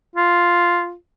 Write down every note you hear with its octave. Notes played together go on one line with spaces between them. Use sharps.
F4